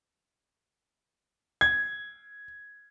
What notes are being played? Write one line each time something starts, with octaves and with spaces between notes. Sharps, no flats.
G#6